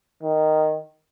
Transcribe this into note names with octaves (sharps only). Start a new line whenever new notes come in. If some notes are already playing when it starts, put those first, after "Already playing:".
D#3